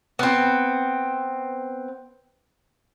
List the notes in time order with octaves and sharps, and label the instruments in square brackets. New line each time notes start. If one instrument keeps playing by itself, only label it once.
[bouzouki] B3 C4